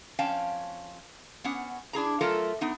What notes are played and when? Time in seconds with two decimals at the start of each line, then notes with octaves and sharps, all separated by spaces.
0.19 F2 C#4 F5 G5 A5
1.44 B3 C#4 F#5
1.93 D4 E4 G#4 A#5
2.21 F#3 A3 F4 A4 A#4
2.61 B3 D#4